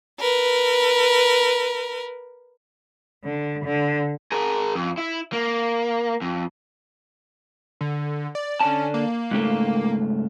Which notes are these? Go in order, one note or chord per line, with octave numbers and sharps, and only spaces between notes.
A#4 B4
D3
D3
G#4 A#4
F2
E4
A#3
F2
D3
D5
D3 C#4 D5 A5
A#3
G#2 C#3 A3